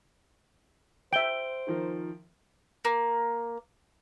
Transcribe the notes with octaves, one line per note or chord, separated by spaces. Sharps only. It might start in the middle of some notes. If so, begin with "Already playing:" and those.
C5 E5 G5 D7 G7
D#3 F3 A#4
A#3